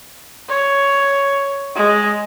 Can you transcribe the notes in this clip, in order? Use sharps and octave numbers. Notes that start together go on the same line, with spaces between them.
C#5
G#3